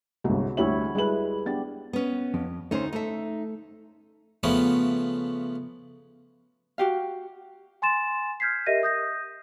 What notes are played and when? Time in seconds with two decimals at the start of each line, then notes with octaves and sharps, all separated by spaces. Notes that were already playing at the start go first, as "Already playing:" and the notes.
0.24 G1 C2 G#3 F#4
0.57 D2 G3 E4 C#5 E5 F#7
0.95 G3 G#3 E4 G#4 B4 F#7
1.46 B3 D4 G4 A6
1.93 B3 C#4
2.34 F2
2.71 D2 A3 C#4 D#4 C5
2.93 A3 D#4 A4 E5
4.43 C#3 F3 A3 B3 C#4
6.78 F#4 G4 F5
7.82 G#5 C6 A6 E7
8.40 F6 G6 G#6 B6 C7
8.66 G4 A#4 D#5 E5 A#6 D#7
8.83 D#6 G6 A#6